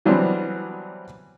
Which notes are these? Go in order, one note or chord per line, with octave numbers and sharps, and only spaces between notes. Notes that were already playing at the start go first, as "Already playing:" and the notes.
E3 F#3 G3 B3 C4 D4